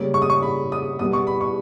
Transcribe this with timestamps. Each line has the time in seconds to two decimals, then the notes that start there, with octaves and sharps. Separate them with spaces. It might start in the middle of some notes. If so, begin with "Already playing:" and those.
Already playing: C#3 G3 A#3 C#4
0.14 C#6
0.22 D#6
0.30 C#6
0.42 B5
0.72 D#6
0.99 B2 G3 B3 D#6
1.13 C#6
1.27 B5
1.41 C#6